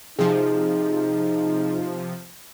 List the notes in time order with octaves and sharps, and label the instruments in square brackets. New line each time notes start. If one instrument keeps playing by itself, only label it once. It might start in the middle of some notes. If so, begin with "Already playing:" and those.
[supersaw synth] C3 F3 [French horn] D#4 [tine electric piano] G#4